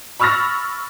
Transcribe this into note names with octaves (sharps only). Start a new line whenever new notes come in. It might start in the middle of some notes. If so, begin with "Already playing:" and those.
B5 C#6 E6 F6 A6 A#6